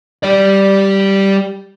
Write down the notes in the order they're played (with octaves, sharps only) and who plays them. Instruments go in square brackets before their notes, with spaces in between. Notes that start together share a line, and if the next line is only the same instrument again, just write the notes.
[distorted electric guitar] G3 D5